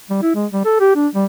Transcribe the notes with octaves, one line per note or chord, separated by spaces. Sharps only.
G3
E4
G#3
G3
A4
G4
D4
G3